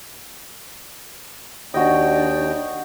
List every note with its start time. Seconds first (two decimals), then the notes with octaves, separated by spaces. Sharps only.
1.74 D#2 D4 D#4 F#4 D#5 G5